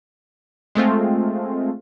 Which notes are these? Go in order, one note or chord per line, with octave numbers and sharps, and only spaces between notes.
G#3 A3 C4 F4